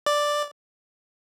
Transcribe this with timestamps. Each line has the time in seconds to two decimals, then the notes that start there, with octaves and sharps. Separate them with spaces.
0.06 D5